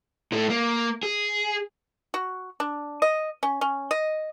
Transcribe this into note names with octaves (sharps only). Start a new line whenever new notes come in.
A2 A3
A#3
G#4
F#4
D4
D#5
C#4
C#4
D#5